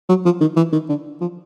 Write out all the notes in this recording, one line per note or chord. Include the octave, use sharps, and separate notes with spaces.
F#3
F3
D#3
E3
D#3
D3
F3